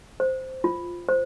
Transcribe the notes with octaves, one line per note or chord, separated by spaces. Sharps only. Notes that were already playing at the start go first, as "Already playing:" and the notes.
C5
F4
C5